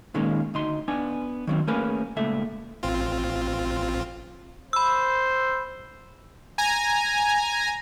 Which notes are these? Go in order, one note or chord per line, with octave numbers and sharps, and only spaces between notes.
A#2 D#3 G#3 A#3 C#4 F4
D2 D#4 C6
B3 D4 G#5
D#3 F#3 C4
A3 A#3 C#4 G#4 A#4 B4
C#2 A#2 A3 E5
A1 C4 F4
C5 B5 E6
G#5 A#5